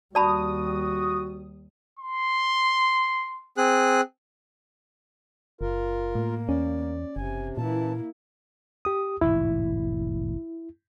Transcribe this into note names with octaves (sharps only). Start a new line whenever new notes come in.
D#2 G3 F#4 D5 A5 B5 D#6
C6
C4 G#4 F#6
F#1 F4 A#4
A2 A#3
E2 C#4 D5
F#1 C3 G#5
A#2 E3 A#3 E4 A5
G4 D#6
E1 A1 G#2 E4